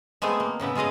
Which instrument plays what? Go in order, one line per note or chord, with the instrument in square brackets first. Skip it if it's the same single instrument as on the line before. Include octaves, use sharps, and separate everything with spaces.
[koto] G#3 A3 B3 C4 G#4
A#3
A2 C#3 B3 E4
G#3 F4 G#4 D#5 F5